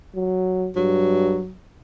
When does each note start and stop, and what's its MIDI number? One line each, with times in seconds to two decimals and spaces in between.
0.16 0.69 54
0.76 1.40 43
0.76 1.53 54